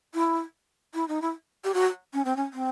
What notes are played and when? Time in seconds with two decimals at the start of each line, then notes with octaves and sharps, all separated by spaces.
0.15 E4
0.94 E4
1.08 D#4
1.22 E4
1.64 G4
1.74 F#4
2.14 C#4
2.25 C4
2.36 C#4
2.54 C4